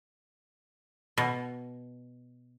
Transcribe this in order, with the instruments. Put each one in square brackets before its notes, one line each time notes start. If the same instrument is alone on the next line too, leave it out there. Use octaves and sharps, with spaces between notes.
[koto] B2